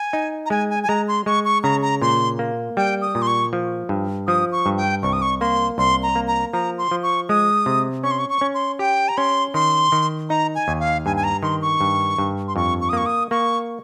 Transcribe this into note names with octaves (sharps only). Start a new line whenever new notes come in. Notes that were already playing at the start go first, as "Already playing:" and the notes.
Already playing: G#5
D#4
A#5
G#3 G#5
G#5
G#5
G#3 A#5
C6
G#3 C#6
C#6
C#3 A#5
A#5
A#2 C6
A#3
G3 G5
D#6
A#2
C6
C#6
F3
G2
F3 D#6
C#6
G2
G5
C2 C#6
D#6
C#6
A#3 C6
C2 C6
A#5
A#3
A#5
F3 A#5
C6
F3
C#6
G#3 D#6
C3
C#4 C#6
C6
C#6
C#6
C#4
C6
G4 G5
A#5
C#4 C6
D#3 C6
D#3
D#4 A#5
G#5
D#2
F5
G2 G#5
G#5
A#5
D#3 C6
C#6
G2
G2
C6
F2 C#6
C#6
D#6
A#3 C#6
D#6
A#3 C#6